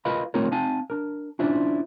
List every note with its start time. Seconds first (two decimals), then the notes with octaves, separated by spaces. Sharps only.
0.05 F4 A#4 B4 D#5 F5 B5
0.34 A3 C4 D#4 F4 A#4 C#5
0.51 C4 D#4 F5 G#5 A5
0.90 D4 A#4
1.39 C#4 D4 E4 F4 C5 D5